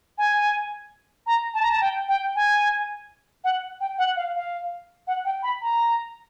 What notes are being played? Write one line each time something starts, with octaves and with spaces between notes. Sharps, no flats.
G#5
A#5
A5
A#5
A5
G5
G5
G#5
F#5
G5
F#5
F5
F5
F#5
G5
B5
A#5